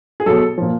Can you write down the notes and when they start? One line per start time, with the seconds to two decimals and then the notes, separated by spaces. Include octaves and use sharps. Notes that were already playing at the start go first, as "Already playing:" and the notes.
0.20 G#4
0.26 B2 F#3 A4
0.58 A#2 F3